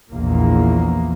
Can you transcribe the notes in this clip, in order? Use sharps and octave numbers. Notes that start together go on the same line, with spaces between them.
A#1 E2 A#2 A#3